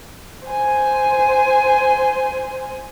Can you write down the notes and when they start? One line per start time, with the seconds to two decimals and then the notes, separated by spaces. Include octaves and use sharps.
0.47 C5 G#5